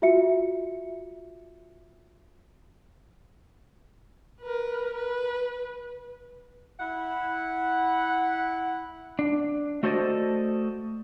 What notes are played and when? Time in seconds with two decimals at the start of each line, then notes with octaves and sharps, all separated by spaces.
0.02 F4 F#4 E5 C#7
4.41 A#4 B4
4.95 B4
6.80 E4 F#5
9.19 D4
9.83 A3 F#4 A4 C5 D5 D#5